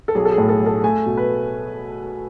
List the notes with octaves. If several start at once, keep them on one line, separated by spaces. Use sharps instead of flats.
A4
B1 G#4
A4
G#4
A2
A4
B1
A4
A3 G#5
B2
B4